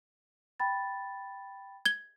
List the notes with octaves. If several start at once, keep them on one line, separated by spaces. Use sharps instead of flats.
G5 B5 A6
G#6 G7